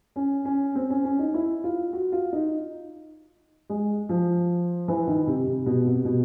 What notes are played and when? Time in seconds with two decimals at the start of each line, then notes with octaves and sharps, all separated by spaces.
0.16 C#4
0.45 C#4
0.75 C4
0.90 C#4
1.05 C#4
1.19 D#4
1.34 E4
1.64 F4
1.93 F#4
2.12 F4
2.33 D#4
3.70 G#3
4.09 F3
4.88 E3
5.07 D#3
5.27 C3
5.47 C3
5.66 B2
5.86 C3
6.05 B2